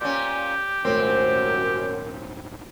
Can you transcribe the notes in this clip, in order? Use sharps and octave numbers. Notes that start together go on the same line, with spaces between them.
A#2 C#4 G4
D#1 G#1 F#2 A3 C4